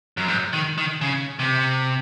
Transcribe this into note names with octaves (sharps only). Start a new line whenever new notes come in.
F#2
G#2
D#3
D#3
C#3
C3